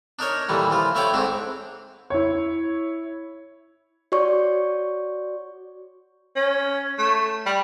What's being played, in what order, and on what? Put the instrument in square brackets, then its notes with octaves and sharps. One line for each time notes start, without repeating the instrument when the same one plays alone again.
[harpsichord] D4 D#4 A#4 C#5
A#2 E3 G3 A3
E3 F3 F4
A3 E4 C#5 D5 G5
G#2 A3 C4 D4
[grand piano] E4 C#5
[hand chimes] F#4 C#5 D5 C#6
[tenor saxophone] C#4
A3
G3